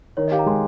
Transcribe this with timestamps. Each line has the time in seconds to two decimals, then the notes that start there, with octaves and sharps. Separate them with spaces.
0.17 D#3 C#5
0.28 D#5
0.32 G4 F5
0.39 A#5
0.46 G#3 C6